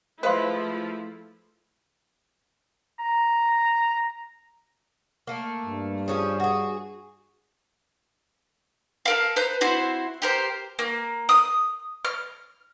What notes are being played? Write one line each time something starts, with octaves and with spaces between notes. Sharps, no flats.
F3 G#3 A3 E4 B4 C5 F5 C6
A#5
A3 A#3
G2
F3 C#4 G#4
F#4 G#4
A4 A#4 F5
B4 C5 A#5 F#6
C4 E4 F#4 C5
G4 A#4 C5
A#3
D#6
F6